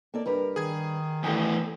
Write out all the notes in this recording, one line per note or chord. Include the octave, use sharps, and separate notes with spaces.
A#3 A4 D5
G2 A#4 B4
D#3 G#4 G#6
E2 A2 A4 G5 G#5